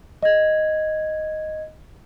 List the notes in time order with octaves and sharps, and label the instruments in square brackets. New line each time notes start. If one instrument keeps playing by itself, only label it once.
[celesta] D#5 G#6